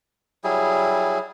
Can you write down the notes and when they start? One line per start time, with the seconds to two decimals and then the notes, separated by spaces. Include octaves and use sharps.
0.44 F#3 G3 E4 G#4